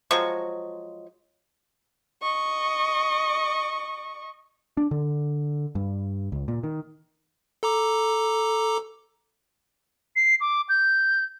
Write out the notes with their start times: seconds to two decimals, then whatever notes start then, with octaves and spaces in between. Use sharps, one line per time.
0.11 F3 F#3 G#3 C#6
2.22 D#5 C#6
4.77 D4
4.91 D3
5.75 G2
6.32 C#2
6.48 A#2
6.64 D#3
7.63 A4 A#5 D6
10.16 C7
10.41 D6
10.69 G6